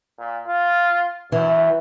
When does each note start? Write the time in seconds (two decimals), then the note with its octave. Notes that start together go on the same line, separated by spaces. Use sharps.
0.19 A#2
0.47 F4
1.32 F#2 E3